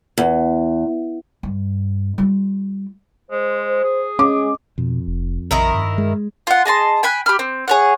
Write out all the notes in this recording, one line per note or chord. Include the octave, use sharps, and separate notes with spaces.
E2
G2
G3 F4
G#3 C5
G#4
G#3 C#4 D6
F2 B2
F1
A#1 D#3 E4 A#4
G2
G#3
F4 F#5
G#4 D#5 A5 C6
G5 G#5 B5 F#6
G4 B5 F6
C4
G#4 C#5 F#5